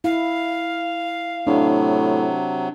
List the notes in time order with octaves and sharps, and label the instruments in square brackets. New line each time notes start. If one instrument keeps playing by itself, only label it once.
[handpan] E4 [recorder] F5
[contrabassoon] A2 [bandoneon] C3 F#3 [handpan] D4